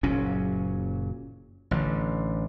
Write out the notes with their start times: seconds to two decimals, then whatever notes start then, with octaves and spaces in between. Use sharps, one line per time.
0.03 F#1 A#2 F#3 C#4
1.71 A1 D3